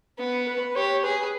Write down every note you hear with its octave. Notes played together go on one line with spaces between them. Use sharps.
B3
B4
G4 C#5
G#4 B4